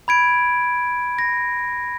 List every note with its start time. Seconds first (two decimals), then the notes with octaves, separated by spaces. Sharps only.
0.08 B5 G#6 D7
1.19 A#6